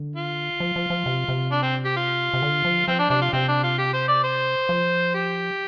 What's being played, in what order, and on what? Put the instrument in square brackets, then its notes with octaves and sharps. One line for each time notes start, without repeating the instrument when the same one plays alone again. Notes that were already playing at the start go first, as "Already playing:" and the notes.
Already playing: [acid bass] D3
[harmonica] F4
[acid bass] F3
F3
F3
C3
C3
[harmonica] D4
C4
G4
F4
[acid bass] C3
D3
F3
[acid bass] F3 [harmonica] C4
[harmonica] D4
[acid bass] C3 [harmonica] D4
[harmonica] F4
[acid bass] C3 [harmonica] C4
[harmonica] D4
F4
G4
C5
D5
C5
[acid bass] F3
[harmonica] G4